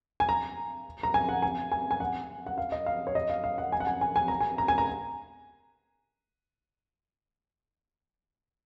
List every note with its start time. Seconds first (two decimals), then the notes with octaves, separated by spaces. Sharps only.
0.20 G#5
0.29 A#5
1.03 A#5
1.14 G#5
1.29 F#5
1.42 G#5
1.72 G#5
1.91 G#5
2.00 F#5
2.46 F#5
2.58 F5
2.72 D#5
2.86 F5
3.07 C#5
3.15 D#5
3.30 F5
3.44 F5
3.58 F#5
3.72 G#5
3.80 F#5
3.87 G#5
4.01 G#5
4.16 G#5
4.28 A#5
4.41 G#5
4.58 A#5
4.68 G#5
4.78 A#5